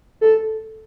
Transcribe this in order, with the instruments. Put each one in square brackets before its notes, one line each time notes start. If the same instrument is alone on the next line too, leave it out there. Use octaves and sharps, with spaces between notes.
[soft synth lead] A4